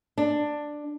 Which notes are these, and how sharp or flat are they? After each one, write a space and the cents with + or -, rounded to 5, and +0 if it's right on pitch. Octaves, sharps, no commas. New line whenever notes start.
D4 +10